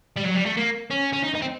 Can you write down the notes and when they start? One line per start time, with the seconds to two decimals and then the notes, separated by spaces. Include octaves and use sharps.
0.16 G3
0.24 F#3
0.35 G3
0.45 A3
0.57 A#3
0.91 C#4
1.13 C#4
1.24 D#4
1.35 D#4
1.42 C4